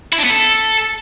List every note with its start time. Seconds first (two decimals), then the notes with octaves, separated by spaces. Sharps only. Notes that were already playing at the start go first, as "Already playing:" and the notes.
0.13 E4
0.19 D4
0.24 B3
0.30 A4